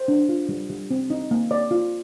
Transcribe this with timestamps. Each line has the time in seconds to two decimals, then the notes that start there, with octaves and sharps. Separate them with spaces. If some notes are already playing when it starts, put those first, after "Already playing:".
Already playing: C5
0.08 D4
0.29 F4
0.49 G3
0.69 G3
0.91 C4
1.10 D#4
1.31 A#3
1.51 D5
1.71 F4